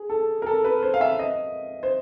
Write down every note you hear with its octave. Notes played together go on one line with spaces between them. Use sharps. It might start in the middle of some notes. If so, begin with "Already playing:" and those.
Already playing: G#4
A4
A#4
A4
B4
C5
F5
E5
D#5
C5